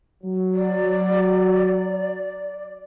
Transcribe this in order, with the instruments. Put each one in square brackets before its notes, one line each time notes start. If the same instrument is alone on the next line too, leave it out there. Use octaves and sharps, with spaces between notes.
[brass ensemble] F#3
[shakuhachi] D5